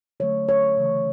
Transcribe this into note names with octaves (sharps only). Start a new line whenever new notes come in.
D3 F#3 A3 C#5
C#5
C#3 E3 A3